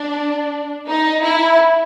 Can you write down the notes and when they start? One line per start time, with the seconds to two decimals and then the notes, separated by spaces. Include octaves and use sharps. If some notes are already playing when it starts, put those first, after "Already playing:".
Already playing: D4
0.87 D#4
1.23 E4